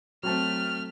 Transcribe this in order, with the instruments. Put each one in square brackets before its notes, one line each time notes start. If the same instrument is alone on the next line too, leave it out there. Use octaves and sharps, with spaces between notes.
[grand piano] F#3 C4 A5 [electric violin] A3 F6